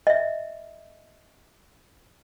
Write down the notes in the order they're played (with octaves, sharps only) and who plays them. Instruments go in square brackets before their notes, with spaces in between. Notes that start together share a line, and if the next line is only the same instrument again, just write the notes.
[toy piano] D#5 E5